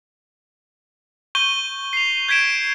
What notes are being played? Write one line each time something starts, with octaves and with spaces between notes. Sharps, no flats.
C#6 G6 D#7 G7
C7 F7
G6 G#6 B6 D7 E7